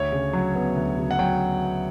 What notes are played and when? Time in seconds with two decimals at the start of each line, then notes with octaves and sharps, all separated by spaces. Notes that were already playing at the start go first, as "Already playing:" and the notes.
Already playing: D2 C#5
0.12 C#3
0.33 F#3
0.55 B3
0.77 D2
0.98 C#3
1.11 F#5
1.19 F#3 G5